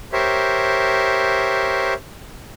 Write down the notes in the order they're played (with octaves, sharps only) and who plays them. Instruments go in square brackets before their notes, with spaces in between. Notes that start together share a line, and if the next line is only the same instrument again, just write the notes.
[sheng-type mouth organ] G4 A#4 C5 C#5 E5